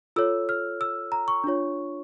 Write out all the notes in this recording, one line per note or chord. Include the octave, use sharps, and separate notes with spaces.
F4 A4 C#5 E6
F6
E6
A#5
C#6
D4 F4 C#5